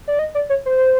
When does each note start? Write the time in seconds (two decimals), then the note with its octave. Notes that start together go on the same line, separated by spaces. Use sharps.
0.08 D5
0.19 D#5
0.35 D5
0.50 C#5
0.66 C5